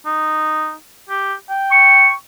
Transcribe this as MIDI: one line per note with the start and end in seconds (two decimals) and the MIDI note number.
0.06 0.74 63
1.10 1.34 67
1.50 2.13 79
1.71 2.11 85